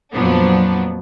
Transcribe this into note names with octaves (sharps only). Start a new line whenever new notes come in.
F2 A#2 F3 F#3 B3 D4